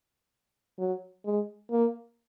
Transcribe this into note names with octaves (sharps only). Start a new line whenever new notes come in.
F#3
G#3
A#3